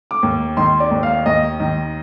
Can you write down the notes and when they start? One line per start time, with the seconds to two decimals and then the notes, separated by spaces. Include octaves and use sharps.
0.11 D6
0.23 D#2
0.57 D#3 C6
0.80 D5
0.91 D#2
1.03 F5
1.26 D#2 D#5
1.60 D#3